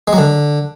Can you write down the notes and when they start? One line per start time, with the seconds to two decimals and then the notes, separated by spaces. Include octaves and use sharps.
0.08 G#3
0.13 F#3
0.18 D3